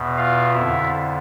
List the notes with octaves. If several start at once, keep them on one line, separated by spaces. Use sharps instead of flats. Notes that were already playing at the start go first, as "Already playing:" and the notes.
Already playing: E2 B2
F4 F5
F2 D3 E4 E5